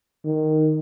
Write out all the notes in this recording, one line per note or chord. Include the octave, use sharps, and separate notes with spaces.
D#3